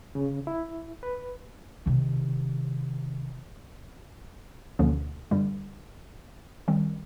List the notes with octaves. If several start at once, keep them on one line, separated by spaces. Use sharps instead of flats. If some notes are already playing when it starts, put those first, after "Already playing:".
C#3
E4
B4
C3 D#3
D2 B2 D3 F3 A#3 C#4
G2 D3 G3
D#3 G3 C4